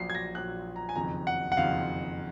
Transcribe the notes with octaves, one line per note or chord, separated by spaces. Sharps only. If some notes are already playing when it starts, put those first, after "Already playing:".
Already playing: A#1 A#2 F#3 C7
G#6
A#6
A#1 A#2 F#3 F#6
A#5
G#5
F#1 F2 D#3 A#5
F#5
F#5
F#1 F2 D#3 F5